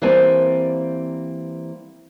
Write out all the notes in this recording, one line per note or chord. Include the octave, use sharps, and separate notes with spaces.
E3 G3 A#3 C4 D5 G#5